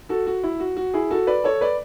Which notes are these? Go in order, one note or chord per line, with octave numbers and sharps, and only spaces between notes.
F#4 A4
F#4
E4
F#4
F#4
E4 G#4
F#4 A4
B4 D5
A4 C#5
B4 D5